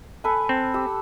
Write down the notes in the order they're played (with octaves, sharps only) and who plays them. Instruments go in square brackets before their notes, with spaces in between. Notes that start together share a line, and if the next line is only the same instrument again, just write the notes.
[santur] A4 B4 G#5
[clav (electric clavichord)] C4
[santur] G4 E6